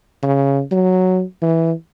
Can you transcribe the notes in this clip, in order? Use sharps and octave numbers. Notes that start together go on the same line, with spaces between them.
C#3
F#3
E3